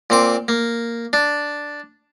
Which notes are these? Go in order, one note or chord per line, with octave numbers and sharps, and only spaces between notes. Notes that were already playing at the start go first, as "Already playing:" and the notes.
A#2 C4 D6
A#3
D4